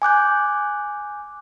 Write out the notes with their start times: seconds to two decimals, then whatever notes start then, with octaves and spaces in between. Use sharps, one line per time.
0.02 G#5 D6 F#6 G6